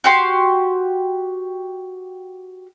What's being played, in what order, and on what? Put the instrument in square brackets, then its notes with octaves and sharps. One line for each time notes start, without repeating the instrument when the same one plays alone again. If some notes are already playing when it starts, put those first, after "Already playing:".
[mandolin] F#4 G4 C6